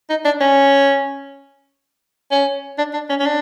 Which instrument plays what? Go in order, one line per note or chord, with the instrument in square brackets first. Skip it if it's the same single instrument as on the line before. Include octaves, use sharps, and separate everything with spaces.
[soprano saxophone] D#4
D4
C#4
C#4
D4
D4
C#4
C#4
D4